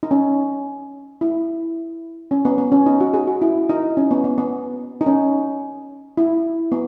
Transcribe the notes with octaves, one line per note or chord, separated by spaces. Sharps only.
D#4
C#4
E4
C#4
B3
B3
C#4
D#4
F#4
G#4
F#4
E4
D#4
C#4
B3
B3
B3
D#4
C#4
E4
B3